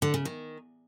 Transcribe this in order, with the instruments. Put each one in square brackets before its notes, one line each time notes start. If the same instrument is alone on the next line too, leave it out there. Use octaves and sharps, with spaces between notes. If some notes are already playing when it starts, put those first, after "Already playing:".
[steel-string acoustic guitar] D3
C#3
D#3